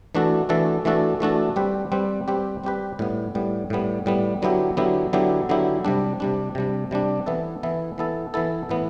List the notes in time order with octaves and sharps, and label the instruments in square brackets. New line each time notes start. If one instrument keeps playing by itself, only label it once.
[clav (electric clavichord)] E3 A3 D4 F#4 A4
E3 A3 D4 F#4 A4
E3 A3 D4 F#4 A4
E3 A3 D4 F#4 A4
G3 C4 G4 B4
G3 C4 G4 B4
G3 C4 G4 B4
G3 C4 G4 B4
A2 G3 B3
A2 G3 B3
A2 G3 B3
A2 G3 B3
D3 F#3 B3 E4 G4
D3 F#3 B3 E4 G4
D3 F#3 B3 E4 G4
D3 F#3 B3 E4 G4
C3 G3 D4
C3 G3 D4
C3 G3 D4
C3 G3 D4
E3 B3 E4 A4
E3 B3 E4 A4
E3 B3 E4 A4
E3 B3 E4 A4
A2 E3 B3